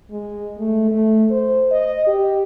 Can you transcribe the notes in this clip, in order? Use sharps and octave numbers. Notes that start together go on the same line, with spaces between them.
G#3
A3
A3
C5
D#5
G4